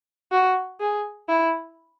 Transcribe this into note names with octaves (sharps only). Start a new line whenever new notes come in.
F#4
G#4
E4